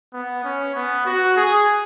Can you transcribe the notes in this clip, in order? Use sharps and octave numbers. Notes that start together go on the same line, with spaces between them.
B3
C#4
B3
F#4
G#4